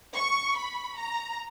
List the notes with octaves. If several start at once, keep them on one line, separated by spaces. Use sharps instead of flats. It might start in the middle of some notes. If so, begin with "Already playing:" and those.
C#6
B5
A#5